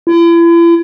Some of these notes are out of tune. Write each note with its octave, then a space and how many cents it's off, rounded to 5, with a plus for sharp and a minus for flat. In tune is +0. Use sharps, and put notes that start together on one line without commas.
E4 +40